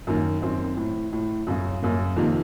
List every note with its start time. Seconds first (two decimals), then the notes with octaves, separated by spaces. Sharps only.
0.07 F#2 D#3 A#3
0.42 F#2 D#3 C4
0.77 A2
1.12 A2
1.47 F#2 C#3
1.82 F#2 C#3 A#3
2.16 F2 C3 D#3 A#3